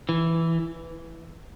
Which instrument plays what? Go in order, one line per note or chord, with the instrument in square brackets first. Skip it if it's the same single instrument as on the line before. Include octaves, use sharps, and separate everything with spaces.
[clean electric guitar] E3